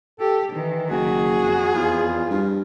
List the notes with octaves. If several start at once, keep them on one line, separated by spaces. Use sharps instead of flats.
G4 A4
D#3 E3
F#1 F#4 G#4
F2
E2 F4
G2